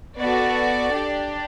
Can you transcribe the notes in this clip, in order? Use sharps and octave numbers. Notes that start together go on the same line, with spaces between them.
B3 F#4 A4 D5
D4 G4